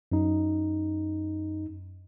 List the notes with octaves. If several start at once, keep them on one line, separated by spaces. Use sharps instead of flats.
F#2 D#4